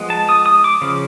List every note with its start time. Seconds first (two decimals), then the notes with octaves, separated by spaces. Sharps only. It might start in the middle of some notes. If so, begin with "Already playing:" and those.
Already playing: F3 G#3 B3
0.10 A5
0.29 D#6
0.46 D#6
0.64 D6
0.81 C#3 F3